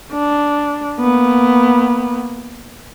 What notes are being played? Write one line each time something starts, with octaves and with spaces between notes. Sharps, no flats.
D4
A#3 B3